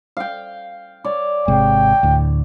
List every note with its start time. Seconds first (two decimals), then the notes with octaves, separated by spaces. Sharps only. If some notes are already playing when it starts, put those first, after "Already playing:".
0.17 F5 G5
1.04 C#5 D5
1.48 G#1 C3 G#3 G5
2.03 D2 A2